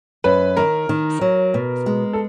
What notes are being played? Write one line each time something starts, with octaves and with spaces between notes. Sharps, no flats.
F#2 B4
D#3 A#4
D#3
F#3
B2
G#3
A4